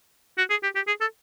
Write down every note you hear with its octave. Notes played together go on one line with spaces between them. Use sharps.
F#4
G#4
G4
G4
G#4
A4